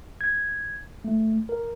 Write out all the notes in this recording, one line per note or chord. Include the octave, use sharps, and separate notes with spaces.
G#6
A3
A#4